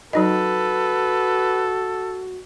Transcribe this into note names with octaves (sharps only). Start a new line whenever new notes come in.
F#3 D#4 F#4 A4 B4 D#5